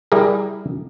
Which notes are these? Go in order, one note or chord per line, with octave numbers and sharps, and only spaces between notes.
G3 E4 G4 G#4 A#4